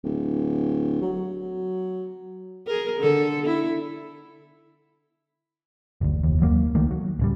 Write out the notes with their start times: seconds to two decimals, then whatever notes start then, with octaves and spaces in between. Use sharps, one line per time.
0.03 D1
1.02 F#3
2.67 G#4 A#4
3.00 D3 A4
3.46 E4
6.01 F#1 D2
6.23 F1 D#2
6.40 D#2 F#3 A#3
6.75 C#2 D#3 A3 A#3
6.91 F#3
7.19 D1 C#3 G3